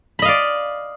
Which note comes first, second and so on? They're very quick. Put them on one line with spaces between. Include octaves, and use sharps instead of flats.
B5 D#5 F5 D5